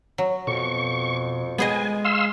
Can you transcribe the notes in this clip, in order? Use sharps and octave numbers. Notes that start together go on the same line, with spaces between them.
F#3
F2 B2 C#6
G#3 B3 G#4 D#5 G#5
F5 C6 E6